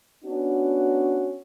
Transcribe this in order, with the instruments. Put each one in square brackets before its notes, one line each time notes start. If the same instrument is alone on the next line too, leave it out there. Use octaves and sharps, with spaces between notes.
[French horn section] B3 C#4 D4 F#4